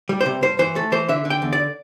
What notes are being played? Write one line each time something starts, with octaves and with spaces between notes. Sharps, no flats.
G3
C5
C3
G2 C5
E3 C5
A3 A4
E3 C5
D3 E5
D3
G5
E2
D5